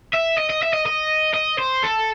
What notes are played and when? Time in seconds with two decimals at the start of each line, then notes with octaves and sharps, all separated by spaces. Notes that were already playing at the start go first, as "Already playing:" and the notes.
0.13 E5
0.37 D#5
0.50 D#5
0.62 E5
0.73 D#5
0.86 D#5
1.34 D#5
1.59 C5
1.83 A4